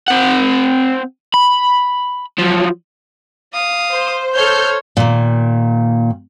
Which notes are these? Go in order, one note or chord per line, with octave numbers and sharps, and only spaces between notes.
C4 F#5
B5
F3 F#3
F5 D#6
C5
A4 C5 C#5 F6 G6
A#2 D#3